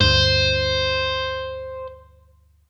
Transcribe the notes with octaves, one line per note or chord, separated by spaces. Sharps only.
D2 G2 C5